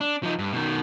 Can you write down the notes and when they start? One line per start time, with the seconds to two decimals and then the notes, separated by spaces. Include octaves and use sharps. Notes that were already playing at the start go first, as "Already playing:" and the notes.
0.01 D4
0.23 F3 D#4
0.39 G2
0.53 B2 D#3